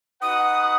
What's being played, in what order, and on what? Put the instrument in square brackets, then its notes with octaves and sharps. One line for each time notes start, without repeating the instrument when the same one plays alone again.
[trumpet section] D#4 F#4 B4 F#5 [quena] D#6